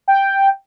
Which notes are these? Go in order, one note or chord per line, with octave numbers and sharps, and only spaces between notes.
G5